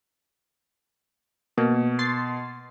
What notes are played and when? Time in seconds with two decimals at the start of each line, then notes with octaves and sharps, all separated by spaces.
1.57 B2 A#3
1.99 C6 A6 C7